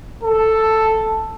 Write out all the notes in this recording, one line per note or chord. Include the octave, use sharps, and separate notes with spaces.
A4